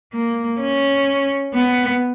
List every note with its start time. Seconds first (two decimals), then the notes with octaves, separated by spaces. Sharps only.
0.14 A#3
0.60 C#4
1.54 B3